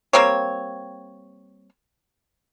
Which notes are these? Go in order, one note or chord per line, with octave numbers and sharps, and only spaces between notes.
G3 A#3 C4 C#5